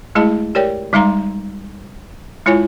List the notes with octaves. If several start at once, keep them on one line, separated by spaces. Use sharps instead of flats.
G#3 A3 E4 G#4 D#5 A5
G4 A#4 C#5 D5 G5
G3 G#3 D#4 F5 A#5 C6
G#3 E4 F4 C#5 G#5